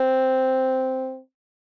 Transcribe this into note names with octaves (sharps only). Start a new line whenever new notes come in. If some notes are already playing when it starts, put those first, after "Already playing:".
Already playing: C4